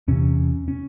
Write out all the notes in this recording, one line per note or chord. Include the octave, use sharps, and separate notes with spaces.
E2 C3 C#4
C#4